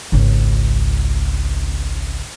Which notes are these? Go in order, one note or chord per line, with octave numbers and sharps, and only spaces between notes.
G#1 C#2